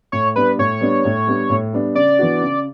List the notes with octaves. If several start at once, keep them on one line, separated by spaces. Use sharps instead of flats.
A2 C#5
G3 B3 D4 B4
A2 C#5
G3 B3 D4
A2
G3 B3 D4
A2
G3 B3 D4
C#3 D5
E3 B3 D4 F#4
C#3